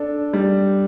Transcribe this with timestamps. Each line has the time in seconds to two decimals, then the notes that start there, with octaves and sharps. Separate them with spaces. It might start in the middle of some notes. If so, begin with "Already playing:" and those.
Already playing: D4 A4
0.33 G3